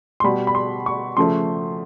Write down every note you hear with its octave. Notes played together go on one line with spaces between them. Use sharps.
C6
B2 G3 B5
B5
C6
C#6
C#3 F3 A3 C6